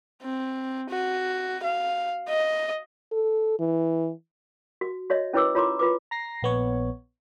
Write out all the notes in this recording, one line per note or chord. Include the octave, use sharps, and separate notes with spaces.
C4
F#4
F5
D#5
A4
E3
F#4
F#4 C#5 D#5 E5
C#4 E4 B4 C#5 D6 E6
F4 C#5 A#5 C6 D6
F4 B4 D6
A#5 A#6 C7
A#1 B3 C#5